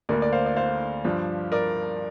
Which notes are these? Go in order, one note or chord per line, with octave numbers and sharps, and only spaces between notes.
D2 D3 A#3 D4 A#4 D5
D5
C5 F5
D5
C5 F5
G2 F3 D4
A#4 D5